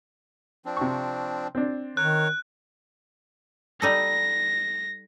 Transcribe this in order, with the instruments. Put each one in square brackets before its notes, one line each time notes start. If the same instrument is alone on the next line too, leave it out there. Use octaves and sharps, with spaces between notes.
[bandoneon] F3 C4 D4
[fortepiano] C3 C#6
C4 D4
[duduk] D#3 [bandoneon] A#4 C#5 [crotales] F#6
[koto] G3 D#4 A4 [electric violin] A#6